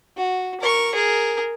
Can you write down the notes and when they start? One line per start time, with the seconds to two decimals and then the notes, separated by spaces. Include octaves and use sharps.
0.17 F#4
0.60 A#4 C#6
0.94 G#4 A#4